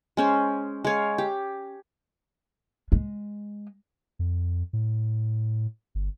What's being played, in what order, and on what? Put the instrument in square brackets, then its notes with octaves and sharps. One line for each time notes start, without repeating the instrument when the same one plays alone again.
[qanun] G#3 C#4 C5
G#3 C#5 F5
G4
[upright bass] G#3
[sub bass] F2
A2
G1